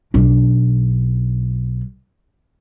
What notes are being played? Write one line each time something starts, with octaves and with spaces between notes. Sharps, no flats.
B1 D4